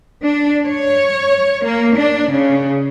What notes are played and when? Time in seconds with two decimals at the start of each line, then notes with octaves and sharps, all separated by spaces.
0.24 D4
0.66 C#5
1.63 A#3
1.97 D4
2.31 C#3